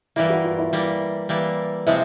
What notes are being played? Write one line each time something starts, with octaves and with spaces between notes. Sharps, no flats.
E3 G3 A#3 E4
F#4
F4
E4
E3 G3 A#3
E3 G3 A#3
C3 F3 G#3 C4 E4